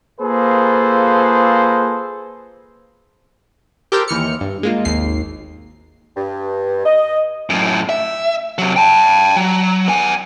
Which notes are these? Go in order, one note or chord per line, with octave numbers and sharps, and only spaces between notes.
A#3 F4 G#4 A4 B4 C5
G4 A4 A#4 C5 G5
D#2 E3 F6 C#7
G2
G#3 A#3 F4
G#1 D#2 C7
G2
D#5
F#2 A2
E5
C3 F#3
G5 A5
F#3
B3 G#5